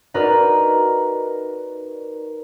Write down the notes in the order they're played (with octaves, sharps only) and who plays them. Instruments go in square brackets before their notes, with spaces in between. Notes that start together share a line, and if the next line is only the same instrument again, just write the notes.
[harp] D#4 F#4 A#4 B4 D5